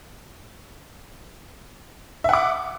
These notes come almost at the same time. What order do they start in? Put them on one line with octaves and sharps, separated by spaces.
E5 F#5 D6